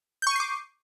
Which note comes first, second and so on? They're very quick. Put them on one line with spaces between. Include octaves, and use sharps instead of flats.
G6 C#6 D#7 C7 D6